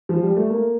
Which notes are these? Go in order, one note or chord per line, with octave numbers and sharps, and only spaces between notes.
F3
G3
A3
A#3